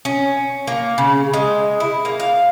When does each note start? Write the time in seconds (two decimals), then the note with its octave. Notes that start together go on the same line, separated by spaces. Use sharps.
0.05 C#4
0.67 A#3
0.98 C#3
1.33 G#3
1.80 E4
2.05 A#3
2.20 F5